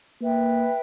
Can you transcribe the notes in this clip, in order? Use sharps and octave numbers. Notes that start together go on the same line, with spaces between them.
A#3 B4 E5 G5